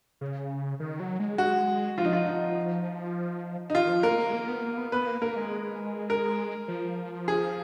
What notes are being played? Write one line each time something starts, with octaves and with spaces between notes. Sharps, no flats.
C#3
D#3
F#3
G#3
F#4
F3 F4
D#4
F4
D#4
D#4
D#3 F4
F3
A#3 A#4
A#3
G#3
A#3
B3
A#3
B3
B3 B4
A#3
A#3 A#4
G#3
A#4
F3
G#4